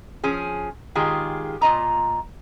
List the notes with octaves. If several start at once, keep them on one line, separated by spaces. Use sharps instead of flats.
F3 C#4 G#4
D#3 G#3 F4 G4 G#4
A#2 F4 D#5 A#5